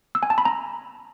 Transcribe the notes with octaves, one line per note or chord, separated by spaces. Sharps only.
E6
G#5
A5
B5
A#5